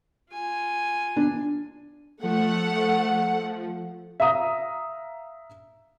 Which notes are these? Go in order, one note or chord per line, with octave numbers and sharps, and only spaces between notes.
F4 G#5
D4
F3 A3 F#5
E5 F5 A#5 D#6